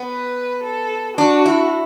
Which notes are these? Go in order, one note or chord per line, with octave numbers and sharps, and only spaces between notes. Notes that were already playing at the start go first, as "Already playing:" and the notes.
Already playing: B3
B4
A4
D4 F#4
E4